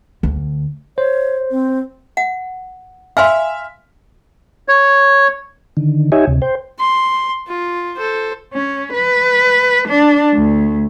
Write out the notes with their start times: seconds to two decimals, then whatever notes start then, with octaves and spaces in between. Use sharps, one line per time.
0.23 D2
0.98 C5 C#5
1.51 C4
2.17 F#5
3.17 E5 F5 G#5 C6 F6
4.68 C#5
5.77 D3 D#3
6.12 D#4 G4 C#5 D#5 E5 G#5
6.27 D2 C3
6.42 C5 G5
6.79 C6
7.47 F4
7.96 A4 C5
8.53 C#4
8.93 B4
9.88 D4
10.34 D2